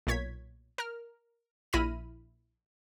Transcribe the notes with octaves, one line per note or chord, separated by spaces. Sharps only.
B1 A#2 C#5 G#6 B6
A#4 F6
A#1 E4 B5 F6 A#6 D#7